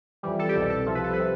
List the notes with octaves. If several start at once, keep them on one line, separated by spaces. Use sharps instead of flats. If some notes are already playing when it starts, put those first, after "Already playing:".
F2 E3 G3
A4
G4
C2 B2 G3 A4
A4
C2 C3 F3
B4
A4
B4
C3